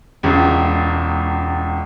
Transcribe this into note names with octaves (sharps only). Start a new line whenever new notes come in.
E1 C#2